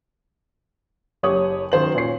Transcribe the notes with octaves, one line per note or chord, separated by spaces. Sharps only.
F#1 G4 C#5 D#6 F#7
F#2 D#3 C5 F#7
A#2 C#4 C#5 C7